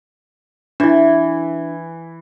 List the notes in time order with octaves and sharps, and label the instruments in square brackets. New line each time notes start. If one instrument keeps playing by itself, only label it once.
[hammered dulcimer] E3 [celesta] D4 E4